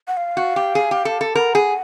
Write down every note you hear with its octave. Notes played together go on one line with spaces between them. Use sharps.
F#5
F5
F#4
G4
G#4
G4
A4
A4
A#4 F#5
G#4